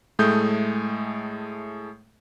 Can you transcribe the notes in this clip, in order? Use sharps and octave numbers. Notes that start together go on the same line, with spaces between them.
A2 G#3 A3 D#6 G6